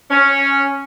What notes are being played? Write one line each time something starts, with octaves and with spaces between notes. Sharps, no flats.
C#4